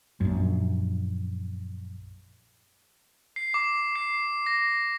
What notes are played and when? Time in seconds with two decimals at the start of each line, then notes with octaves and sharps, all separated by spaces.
0.21 A#1 F#2
3.36 C7
3.54 D6
3.96 C7
4.46 A#6